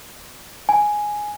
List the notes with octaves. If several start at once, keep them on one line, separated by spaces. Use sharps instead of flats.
G#5